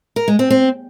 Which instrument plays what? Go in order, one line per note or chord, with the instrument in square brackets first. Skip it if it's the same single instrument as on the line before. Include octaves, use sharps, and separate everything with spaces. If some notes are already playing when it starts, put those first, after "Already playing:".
[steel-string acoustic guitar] A#4
G#3
C4
C4